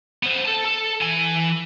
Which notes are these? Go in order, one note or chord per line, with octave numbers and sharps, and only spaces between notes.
B3 C5
A4 A5
A4
E3 G#5